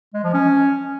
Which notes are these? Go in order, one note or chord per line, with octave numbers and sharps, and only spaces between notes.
G#3
F3
C#4